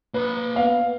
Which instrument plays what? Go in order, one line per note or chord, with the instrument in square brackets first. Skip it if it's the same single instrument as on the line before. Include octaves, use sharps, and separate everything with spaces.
[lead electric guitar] A#3 B5 [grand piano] B4
[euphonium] B3 [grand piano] F5